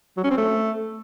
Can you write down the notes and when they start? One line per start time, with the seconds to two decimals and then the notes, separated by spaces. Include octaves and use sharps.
0.17 F#3
0.24 C#4
0.31 C4
0.37 A3